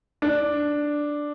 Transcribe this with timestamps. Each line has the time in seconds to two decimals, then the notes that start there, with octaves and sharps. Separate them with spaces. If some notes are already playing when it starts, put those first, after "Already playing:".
0.22 D4